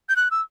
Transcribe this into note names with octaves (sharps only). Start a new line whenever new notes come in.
G6
F#6
E6